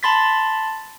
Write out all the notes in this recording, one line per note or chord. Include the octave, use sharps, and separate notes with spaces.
A5 B5 C6 A6 B6